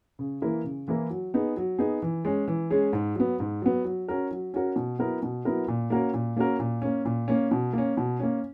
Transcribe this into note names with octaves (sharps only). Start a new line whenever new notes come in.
C#3
E3 A#3 E4 A#4
C#3
E3 A#3 E4 A#4
F#3
B3 D#4 G#4
F#3
B3 D#4 G#4
E3
G#3 C#4 G#4
E3
G#3 C#4 G#4
G#2
F#3 B3
G#2
F#3 B3
F#3
C#4 F#4 A#4
F#3
C#4 F#4 A#4
B2
F#3 B3 E4 A#4
B2
F#3 B3 E4 A#4
A#2
A#3 C#4 F#4 A#4
A#2
A#3 C#4 F#4 A#4
A#2
A#3 C#4
A#2
A#3 C#4
B2
A#3 C#4
B2
A#3 C#4